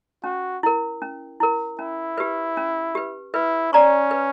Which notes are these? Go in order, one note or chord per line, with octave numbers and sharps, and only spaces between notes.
C#4 F#4
E4 A#4
C#4
E4 A#4
C#4 E4
G4 B4
C#4
G4 B4
E4 B4
C#4 D5 A#5 C#6
B4